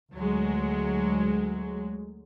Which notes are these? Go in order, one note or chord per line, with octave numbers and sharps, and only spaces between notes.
D2 F#3 G#3